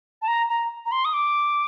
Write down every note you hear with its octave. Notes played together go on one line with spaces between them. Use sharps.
A5
A#5
A#5
A#5
C6
D#6
D6